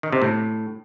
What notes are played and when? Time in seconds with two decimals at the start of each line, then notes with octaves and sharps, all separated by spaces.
0.03 D#3
0.12 C3
0.22 A2